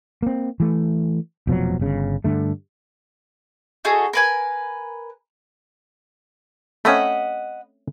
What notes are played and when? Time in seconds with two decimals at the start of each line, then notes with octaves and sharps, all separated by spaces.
0.23 A#3 C4
0.60 E3 A3
1.47 F1 B2 F3 F#3
1.79 G1 C#3
2.24 G2 D3 A3
3.85 D#4 F#4 G#4 A4
4.13 A#4 B4 G#5
6.85 A3 C4 C#4 D#5 F#5 B5